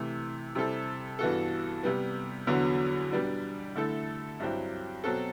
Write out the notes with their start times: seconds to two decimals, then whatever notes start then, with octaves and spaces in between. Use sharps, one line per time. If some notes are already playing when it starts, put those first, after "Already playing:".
Already playing: C3 E3 A3
0.55 C3 G3 C4 E4 A4
1.19 G2 E3 B3 F#4 A4
1.83 C3 G3 B3
2.47 E2 D3 F#3 B3 F#4
3.12 B2 G3 B3 D4
3.75 D3 A3 E4 A4
4.40 G2 F#3 C4 E4 G4
5.04 B2 F#3 C4 F#4 A4